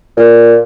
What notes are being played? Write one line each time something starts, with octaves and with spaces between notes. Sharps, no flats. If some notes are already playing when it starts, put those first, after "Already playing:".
A#2